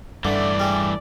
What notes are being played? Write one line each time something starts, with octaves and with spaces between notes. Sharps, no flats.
G2 D3 E3 A3 D5
G3 G#3